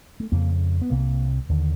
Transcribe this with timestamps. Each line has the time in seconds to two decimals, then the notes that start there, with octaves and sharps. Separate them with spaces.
0.20 A3
0.32 F2 C#3 A#3
0.81 B3
0.90 C2 C3 A#3
1.49 D#2 D3